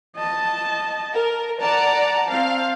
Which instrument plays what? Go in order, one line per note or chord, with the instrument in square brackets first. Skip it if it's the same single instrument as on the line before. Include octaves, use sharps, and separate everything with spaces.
[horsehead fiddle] D#5 A5
[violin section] A#4
[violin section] D5 F#5 A5 [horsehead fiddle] A#5
[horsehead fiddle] C4 [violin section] F5